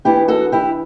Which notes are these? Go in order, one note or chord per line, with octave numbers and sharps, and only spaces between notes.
E3 B3 D4 E4 G4
F#4 A4
E4 G4